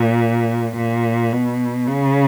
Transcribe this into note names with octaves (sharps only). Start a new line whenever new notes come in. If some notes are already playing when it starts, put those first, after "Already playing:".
Already playing: A#2
A#2
B2
C#3